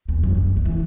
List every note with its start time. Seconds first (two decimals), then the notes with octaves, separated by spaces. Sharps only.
0.08 E2
0.23 F#2
0.37 G2
0.57 B2
0.65 E3